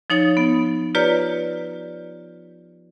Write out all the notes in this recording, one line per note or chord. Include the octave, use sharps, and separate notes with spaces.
F3 D#4 C#5 A6
B3
F4 G4 B4 C#5 D5 A#5